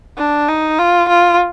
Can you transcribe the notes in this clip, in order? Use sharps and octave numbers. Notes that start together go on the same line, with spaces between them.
D4
D#4
F4
F4